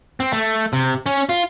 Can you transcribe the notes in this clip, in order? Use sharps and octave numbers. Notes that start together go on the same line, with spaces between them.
C4
A3
C3
C#4
F4